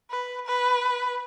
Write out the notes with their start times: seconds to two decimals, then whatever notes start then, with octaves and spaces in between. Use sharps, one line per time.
0.10 B4
0.46 B4